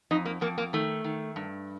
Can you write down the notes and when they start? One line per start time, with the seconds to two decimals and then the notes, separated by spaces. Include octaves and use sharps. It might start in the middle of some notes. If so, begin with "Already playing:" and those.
0.11 F2 D#4
0.25 A#3
0.41 F2 A#3
0.58 A#3
0.73 D#3 A3
1.04 D#3
1.36 G2